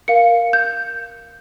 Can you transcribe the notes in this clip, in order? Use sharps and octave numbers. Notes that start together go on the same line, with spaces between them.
A#4 F5 C#7
G6